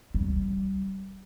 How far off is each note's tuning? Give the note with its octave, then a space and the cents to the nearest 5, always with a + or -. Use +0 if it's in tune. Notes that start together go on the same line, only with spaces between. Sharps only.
G3 -25